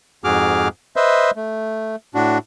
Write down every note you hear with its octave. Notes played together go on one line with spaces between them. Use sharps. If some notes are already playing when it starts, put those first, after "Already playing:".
F2 G#2 F#4 G#4 D6 F6
B4 C5 D#5 E5
A3
A2 D4 F#4